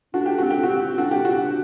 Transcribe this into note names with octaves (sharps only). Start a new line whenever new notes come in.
D4 F#4
G4
C4 F#4
G4
F#4
C4
D4 F#4
G4
F#4